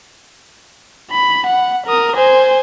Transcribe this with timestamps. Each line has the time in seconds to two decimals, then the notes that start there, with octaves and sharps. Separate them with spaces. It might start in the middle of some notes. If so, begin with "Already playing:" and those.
1.11 B5
1.47 F#5
1.87 A#4 D#6
2.16 C5 G#5